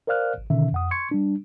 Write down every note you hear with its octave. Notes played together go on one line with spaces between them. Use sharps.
A#4 C5 D5 F5 F6 F#6
G#1
B2 D3 D#3 C#4 E5
F2 F#5 D#6
C6 C#6 G#6 C#7
G3 D4